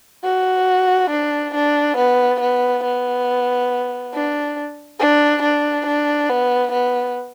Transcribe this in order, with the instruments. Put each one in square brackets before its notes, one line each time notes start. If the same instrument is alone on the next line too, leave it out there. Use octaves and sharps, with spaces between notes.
[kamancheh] F#4
D4
D4
B3
B3
B3
D4
D4
D4
D4
B3
B3